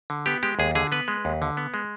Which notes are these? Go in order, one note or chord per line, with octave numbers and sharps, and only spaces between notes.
D3
B3 G4
G#3 G4
D#2 G#4
D3 G#4
B3 B4
G#3
D#2
D3
B3
G#3